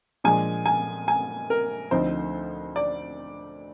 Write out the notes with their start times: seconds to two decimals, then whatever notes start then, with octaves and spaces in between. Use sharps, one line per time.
0.24 A#2 F3 G#3 D4 G#5
0.66 G#5
1.08 G#5
1.50 A#4
1.91 D2 D3 F3 C4 D#4 C5
2.76 D5